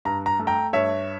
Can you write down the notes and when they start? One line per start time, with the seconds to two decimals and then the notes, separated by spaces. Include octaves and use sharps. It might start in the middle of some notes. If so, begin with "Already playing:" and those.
0.05 G2 A#5
0.26 A#5
0.39 A3
0.47 G5 A#5
0.73 G2 C#5 E5